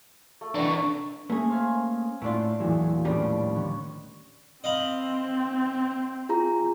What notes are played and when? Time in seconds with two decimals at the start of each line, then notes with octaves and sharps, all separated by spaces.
0.41 A3
0.55 E3 D4 C#6
1.30 A3 A#3 C#4 G#4
1.49 C5 F5 G#5
2.22 A2 A3 D4 F4 C7 D7
2.60 E2 A#2 E3 F#3 E4 F#4
3.05 D#2 A2 F3 G3 C#4 D4 D6
3.55 D3 D#3 C#5
4.64 C4 D#5 F5 B5
6.29 F4 G#4 A#5